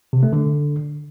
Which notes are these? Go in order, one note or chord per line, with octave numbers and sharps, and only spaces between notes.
C3
A3
D3